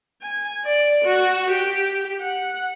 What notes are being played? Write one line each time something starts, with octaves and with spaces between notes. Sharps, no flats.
G#5
D5
F#4
G4
F#5